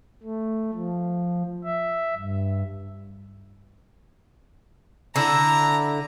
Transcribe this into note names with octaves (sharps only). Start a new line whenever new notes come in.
A3
F3
E5
G2
D3 E4 A#5